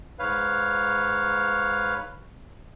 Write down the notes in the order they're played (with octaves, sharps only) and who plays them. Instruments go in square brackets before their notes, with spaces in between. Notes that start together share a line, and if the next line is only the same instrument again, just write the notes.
[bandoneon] G#2 B4 C#5 F5